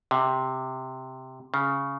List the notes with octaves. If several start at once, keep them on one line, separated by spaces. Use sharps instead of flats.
C3
C#3